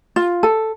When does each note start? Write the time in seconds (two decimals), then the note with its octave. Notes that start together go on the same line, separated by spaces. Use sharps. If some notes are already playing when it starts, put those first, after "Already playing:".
0.16 F4
0.43 A4